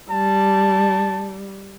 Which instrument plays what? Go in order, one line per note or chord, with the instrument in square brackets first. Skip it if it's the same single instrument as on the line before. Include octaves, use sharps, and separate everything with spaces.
[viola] G3 [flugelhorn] A5